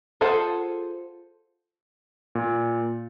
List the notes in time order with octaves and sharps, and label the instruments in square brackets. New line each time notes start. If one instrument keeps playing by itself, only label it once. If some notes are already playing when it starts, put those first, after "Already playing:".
[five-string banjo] F4 G#4 A4 C5 F#5
[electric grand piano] A#2